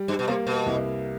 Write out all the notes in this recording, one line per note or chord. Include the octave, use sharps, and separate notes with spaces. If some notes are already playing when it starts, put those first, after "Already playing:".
Already playing: G3
G2
B2
C3 A#3
B2
C2